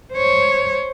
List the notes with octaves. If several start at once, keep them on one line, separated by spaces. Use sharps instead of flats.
C5 C#5